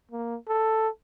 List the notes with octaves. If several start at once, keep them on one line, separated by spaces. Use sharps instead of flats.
A#3
A4